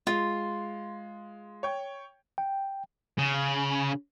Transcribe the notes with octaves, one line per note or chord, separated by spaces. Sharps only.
G#3 F4
C#5 G5
G5
C#3